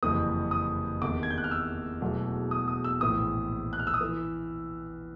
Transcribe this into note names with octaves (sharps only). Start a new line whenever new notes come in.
F#1 F2 C3 E3 D#6
D#6
E2 C3 D#3 D6
G#6
G6
F#6
F6
E6
E1 E2 B2 F#3 A3
D#6
D#6
E6
A#1 A2 E3 D#6
F#6
F6
E6
D#6
E3